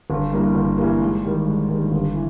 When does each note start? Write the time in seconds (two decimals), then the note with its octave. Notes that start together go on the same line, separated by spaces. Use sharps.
0.10 G1
0.33 G2 E3 G3 A#3
0.55 G1
0.78 G2 E3 G3 A#3
1.01 G#2
1.24 D#3 G3
1.47 G#2
1.69 D#3 G3
1.92 G1
2.14 E3